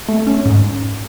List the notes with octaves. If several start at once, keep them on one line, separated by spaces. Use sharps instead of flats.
A3
C#4
G#2